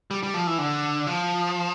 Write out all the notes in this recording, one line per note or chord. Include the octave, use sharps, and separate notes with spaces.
G3
G3
F3
E3
D3
F3